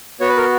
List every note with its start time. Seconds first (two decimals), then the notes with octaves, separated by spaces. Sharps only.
0.20 B3 F#4 C#5
0.29 B4
0.37 A#4